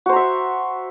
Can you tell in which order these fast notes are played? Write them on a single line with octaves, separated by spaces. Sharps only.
F#4 C5 A#5 E5